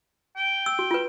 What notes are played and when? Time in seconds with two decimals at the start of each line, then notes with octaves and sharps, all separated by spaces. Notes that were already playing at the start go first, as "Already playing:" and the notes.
0.36 G5
0.66 E6
0.79 F#4
0.91 F4 B4